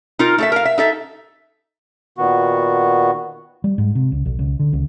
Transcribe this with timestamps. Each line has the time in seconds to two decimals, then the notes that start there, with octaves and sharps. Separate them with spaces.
0.19 D#4 F4 A#4
0.38 A3 A4 E5
0.52 A#4 F5
0.65 E5
0.78 D#4 A4 E5
2.18 A#2 D#3 B3 F#4
3.64 G3
3.78 G#2
3.95 C3
4.12 C#2
4.26 B1
4.39 C#2
4.59 D3
4.73 C#2